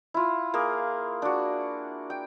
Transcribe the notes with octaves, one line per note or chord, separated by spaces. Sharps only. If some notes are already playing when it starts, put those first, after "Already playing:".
E4 F4
A#3 G#4
D4 F#4
G5